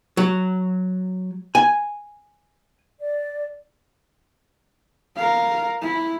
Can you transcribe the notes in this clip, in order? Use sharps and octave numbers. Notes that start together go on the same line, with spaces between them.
F#3
G#5
D5
A#4 F5
E4